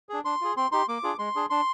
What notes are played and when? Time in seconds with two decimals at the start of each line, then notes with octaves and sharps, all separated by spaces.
0.09 D4 G#4
0.25 D4 C6
0.41 F4 G#4
0.56 C4 C6
0.72 D#4 G4 C6
0.88 A#3 D6
1.03 D4 F4 G#4
1.19 G#3 C6
1.35 D4 G#4
1.50 D4 C6